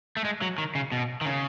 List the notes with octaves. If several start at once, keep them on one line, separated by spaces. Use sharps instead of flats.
A3
G#3
F#3
D#3
C#3
B2
D#3
C#3